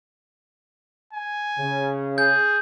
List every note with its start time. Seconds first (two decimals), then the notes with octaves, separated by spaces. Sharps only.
1.13 G#5
1.58 C#3
2.18 G#4 G6